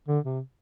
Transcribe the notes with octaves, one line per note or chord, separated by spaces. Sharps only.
D3
C3